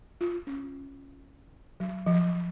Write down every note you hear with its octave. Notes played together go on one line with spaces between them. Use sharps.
F4
C#4
F#3
F3